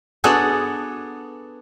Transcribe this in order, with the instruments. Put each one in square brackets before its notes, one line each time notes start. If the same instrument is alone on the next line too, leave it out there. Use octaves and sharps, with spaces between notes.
[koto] B3 D4 F#4 G#4 A4